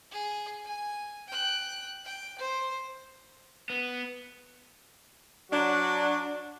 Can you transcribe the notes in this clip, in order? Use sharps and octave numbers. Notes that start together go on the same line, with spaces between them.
G#4
G#5
G5 F#6
G5
C5
B3
F#3 D4 F#4